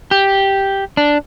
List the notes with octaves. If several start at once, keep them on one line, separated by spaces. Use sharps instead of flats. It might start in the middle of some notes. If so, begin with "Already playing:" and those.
G4
D4